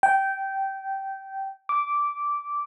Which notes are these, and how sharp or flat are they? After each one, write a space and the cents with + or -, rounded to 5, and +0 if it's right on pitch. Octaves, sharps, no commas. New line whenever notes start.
G5 -15
D6 -10